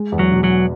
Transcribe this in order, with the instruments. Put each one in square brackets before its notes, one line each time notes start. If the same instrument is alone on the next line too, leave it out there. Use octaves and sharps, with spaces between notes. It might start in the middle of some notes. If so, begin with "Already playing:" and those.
Already playing: [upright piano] G#3
E2
[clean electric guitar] F#3
[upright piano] B2
[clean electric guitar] F#3